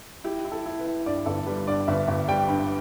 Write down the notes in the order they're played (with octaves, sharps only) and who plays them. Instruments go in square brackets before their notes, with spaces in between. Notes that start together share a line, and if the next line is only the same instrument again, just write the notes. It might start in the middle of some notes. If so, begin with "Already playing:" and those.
[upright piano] E4 G4
E4
A4
E4
B4
E4
G2 D5
G1 A4
G3 B4
G2 D5
G1 E5
G1
G3 G5
G2